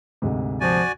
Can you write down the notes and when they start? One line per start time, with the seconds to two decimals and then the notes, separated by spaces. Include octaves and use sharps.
0.22 D2 G#2 C3
0.61 F3 F#4 D5 G#5